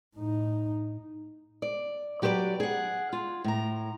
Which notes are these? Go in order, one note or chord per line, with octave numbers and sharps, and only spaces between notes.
A2 D#4
D5
F#3 G4 B4 C5 D5
G#4 F#5
F4
A2 A#5